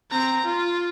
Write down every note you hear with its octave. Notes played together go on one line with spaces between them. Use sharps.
C4 A#5
F4